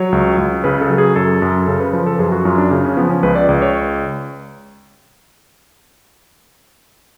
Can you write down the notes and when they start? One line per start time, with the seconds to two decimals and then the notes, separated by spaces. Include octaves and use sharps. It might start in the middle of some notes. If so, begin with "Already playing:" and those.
Already playing: F#3 C#5
0.12 C#2
0.38 C#2
0.64 C#3 B4
0.81 A4
0.90 F#3
0.98 G#4
1.16 F#2 A4
1.42 F#2
1.67 C#3 A4
1.80 B4
1.93 F3 B4
2.06 A4
2.19 F#2 G#4
2.32 F#4
2.45 F#2 F4
2.58 D4
2.71 C#3
2.84 C#4
2.97 F3 B3
3.10 C#4
3.23 C#2 B4
3.35 D5
3.49 C#2 D5
3.62 C#5